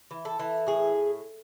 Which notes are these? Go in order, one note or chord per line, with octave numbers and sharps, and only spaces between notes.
E3
A4
E3
A2 G#4